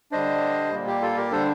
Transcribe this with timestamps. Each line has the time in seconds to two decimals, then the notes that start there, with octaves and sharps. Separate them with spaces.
0.12 D3 G3 D4 C5 D#5
0.72 A#2 G3 A#3
0.87 G4
1.01 F4 A4
1.17 G4 A#4
1.32 D3 G3 D4 A4 C5